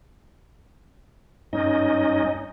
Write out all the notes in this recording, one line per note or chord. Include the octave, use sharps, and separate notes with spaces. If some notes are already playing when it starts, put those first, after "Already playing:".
G2 C#4 D#4 D#5